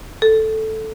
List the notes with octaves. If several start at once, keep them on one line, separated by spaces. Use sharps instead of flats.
A4